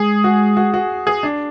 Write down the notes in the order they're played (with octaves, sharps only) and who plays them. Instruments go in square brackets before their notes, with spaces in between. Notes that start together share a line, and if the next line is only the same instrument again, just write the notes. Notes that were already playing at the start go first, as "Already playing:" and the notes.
Already playing: [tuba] G#3 [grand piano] G#4
[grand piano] F#4
F#4
F#4
G#4
D4